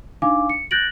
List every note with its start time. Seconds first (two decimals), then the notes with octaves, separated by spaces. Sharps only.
0.22 D4 D#4 F5 G#5 D6
0.50 C#7
0.71 F#6 G6 A6 A#6 D7 F#7